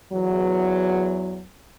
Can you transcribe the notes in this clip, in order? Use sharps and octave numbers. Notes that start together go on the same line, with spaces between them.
E2 F#3